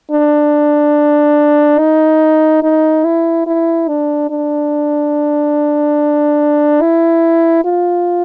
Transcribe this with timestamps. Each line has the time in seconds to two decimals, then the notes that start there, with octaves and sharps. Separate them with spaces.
0.11 D4
1.79 D#4
2.63 D#4
3.05 E4
3.47 E4
3.88 D4
4.30 D4
6.82 E4
7.65 F4